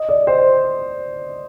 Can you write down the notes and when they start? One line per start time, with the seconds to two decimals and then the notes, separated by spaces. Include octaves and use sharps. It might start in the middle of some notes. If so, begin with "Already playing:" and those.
Already playing: D#5
0.09 D5
0.27 C5